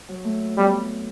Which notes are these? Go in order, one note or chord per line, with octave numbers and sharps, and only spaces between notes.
F#3
A3
G3 B3